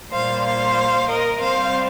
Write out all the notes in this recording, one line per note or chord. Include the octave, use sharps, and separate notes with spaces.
A#2 G3 A#3 C5 F5
C5 F5
A#4 D#5
C3 G3 C4 C5 F5